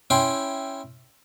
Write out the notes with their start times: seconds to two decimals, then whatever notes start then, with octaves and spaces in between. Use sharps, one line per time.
0.10 C#4 E4 G5 C6